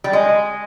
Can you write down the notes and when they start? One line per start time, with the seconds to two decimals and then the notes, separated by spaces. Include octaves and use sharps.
0.04 G3
0.13 G#3